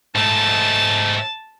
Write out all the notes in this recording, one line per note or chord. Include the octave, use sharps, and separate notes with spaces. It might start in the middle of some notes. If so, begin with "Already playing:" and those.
G#2 A3 A5